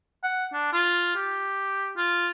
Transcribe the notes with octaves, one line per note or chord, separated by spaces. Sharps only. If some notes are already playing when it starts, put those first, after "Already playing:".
F#5
D4
F4
G4
F4